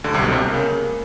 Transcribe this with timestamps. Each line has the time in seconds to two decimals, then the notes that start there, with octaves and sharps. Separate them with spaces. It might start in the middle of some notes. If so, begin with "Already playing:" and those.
0.04 D2 D3 G#3
0.14 C2 C3
0.23 B1 B2 G#3
0.32 C2 C3
0.42 A#3
0.54 C#3